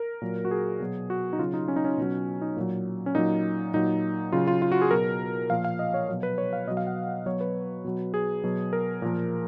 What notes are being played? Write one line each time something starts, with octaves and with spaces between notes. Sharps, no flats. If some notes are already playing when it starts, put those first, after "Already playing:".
Already playing: A#4
A#2 F#3
F#4
G#4
B2 F#3
F#4
D#4
C#3 F#3 F4
D#4
C#4
D#4
C#4
B2 F#3
D#4
A#2 F#3
C#4
A#2 F#3 D#4
A#2 F#3 D#4
C#3 F#3 F4
F4
F4
F#4
G#4
B2 F#3 A#4
A#2 F3 F5
F5
D#5
C#5
B2 F#3
B4
C#5
F5
B2 F#3 D#5
F5
F#5
B2 F#3 C#5
B4
B2 F#3
G#4
B2 F#3
A#4
A#2 F3